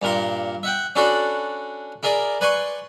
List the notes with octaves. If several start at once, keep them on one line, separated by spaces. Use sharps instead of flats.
G2 A#2 A#4 C6
E5 F#5 G5
C#4 D4 F#4 A4 D5 B5
E4 G#4 A#4 D5
B4 D5 G#5 C6 C#6